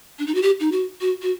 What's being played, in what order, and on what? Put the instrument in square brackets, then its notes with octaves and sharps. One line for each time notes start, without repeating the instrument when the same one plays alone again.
[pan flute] D4
D#4
F#4
G4
D#4
F#4
F#4
F#4